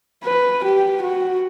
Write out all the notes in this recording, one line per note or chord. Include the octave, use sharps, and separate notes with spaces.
B4
G4
F#4